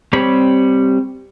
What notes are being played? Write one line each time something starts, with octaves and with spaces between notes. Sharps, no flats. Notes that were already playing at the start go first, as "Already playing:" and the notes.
G3 C4 G4 C#5 B5